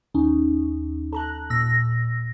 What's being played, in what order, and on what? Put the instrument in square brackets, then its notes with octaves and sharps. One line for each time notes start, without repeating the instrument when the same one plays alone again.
[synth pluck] D#2 [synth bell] C#4 D#4
[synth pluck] A4 A#5 F#6
[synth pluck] A#2 [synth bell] E6 A#6